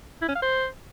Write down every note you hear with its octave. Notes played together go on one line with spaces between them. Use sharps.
E4
C#4
F5
C5